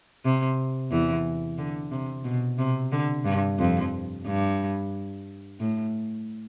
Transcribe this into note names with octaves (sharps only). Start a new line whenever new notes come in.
C3
E2 E3
D3
C3
B2
C3
D3
G2
F2
G2
A2